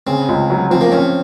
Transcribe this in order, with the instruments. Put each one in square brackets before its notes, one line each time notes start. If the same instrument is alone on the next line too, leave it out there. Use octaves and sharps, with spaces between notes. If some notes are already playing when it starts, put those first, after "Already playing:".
[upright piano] C#3 [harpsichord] C4
[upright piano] C#2
F#3
[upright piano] F3 [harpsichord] C4
[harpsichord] A#3
[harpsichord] C4 [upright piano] C#4